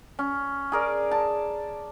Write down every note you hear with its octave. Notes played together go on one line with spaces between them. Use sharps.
C#4
G#4 A#4 D5
A5